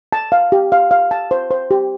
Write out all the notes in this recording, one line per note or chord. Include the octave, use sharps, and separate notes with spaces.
A5
F5
G4
F5
F5
A5
C5
C5
G4